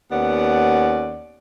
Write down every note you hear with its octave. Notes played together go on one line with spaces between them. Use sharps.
D#2 B3 C#4 D5 F#5